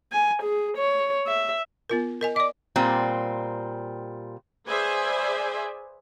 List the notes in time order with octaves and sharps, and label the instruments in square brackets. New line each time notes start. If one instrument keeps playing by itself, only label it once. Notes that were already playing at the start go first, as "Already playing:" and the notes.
[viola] G#5
G#4
C#5
E5
[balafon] B3 F4 A#4
A#4 D#5 G#5
[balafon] D5 D#5 [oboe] D6
[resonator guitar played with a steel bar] A#2 G3 C4
[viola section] G#4 B4 C5 D5 E5 G#5